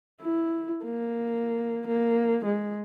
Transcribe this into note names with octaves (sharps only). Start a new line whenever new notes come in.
E4
A#3
A#3
G#3